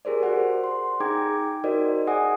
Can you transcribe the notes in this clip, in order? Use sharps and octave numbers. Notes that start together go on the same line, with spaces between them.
G4 G#4 A#4 C5 D5
F#4 A#4 C5 F#5
C6
D#4 G#4 G5 A#5 D6 G#6
D#4 F#4 A#4 C5 D5 D#5
G#4 D5 F#5 G#5 D#6